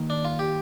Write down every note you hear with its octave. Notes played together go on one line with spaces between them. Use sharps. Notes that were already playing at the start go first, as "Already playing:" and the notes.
Already playing: D#2 D#3 A#3
D4
F4
G4